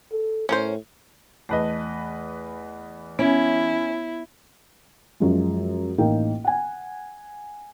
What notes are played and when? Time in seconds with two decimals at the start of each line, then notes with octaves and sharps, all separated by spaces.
0.12 A4
0.49 A2 C#4 A#4 C5
1.49 E2 A3 B4 D#5
3.19 B3 C#4 E4
5.20 F#2 F3 G#3
5.98 A1 A#3 D#4 A#4 G5
6.44 F#5 G#5